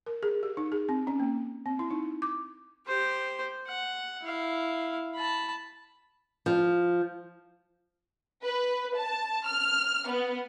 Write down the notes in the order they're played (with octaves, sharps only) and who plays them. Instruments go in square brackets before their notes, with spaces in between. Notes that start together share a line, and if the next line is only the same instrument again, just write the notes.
[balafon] A#4
G#4
G4
D#4
G#4
C4
C#4
A#3
C4
E4
D#4
D6
[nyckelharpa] G4 C5
F#5
E4 F5
A5 B5
[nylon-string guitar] F3
[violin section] B4
A5
F6
B3